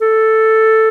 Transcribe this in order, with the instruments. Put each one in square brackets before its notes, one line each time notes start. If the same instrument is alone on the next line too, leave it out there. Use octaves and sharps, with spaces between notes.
[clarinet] A4